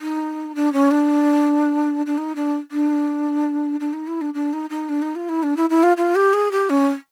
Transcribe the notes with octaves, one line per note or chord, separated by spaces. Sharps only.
D#4
D4
C#4
D4
D4
D#4
D4
D4
D4
D#4
E4
D4
D4
D#4
D#4
D4
D#4
F4
E4
D4
E4
E4
F4
F4
G4
G#4
G4
C#4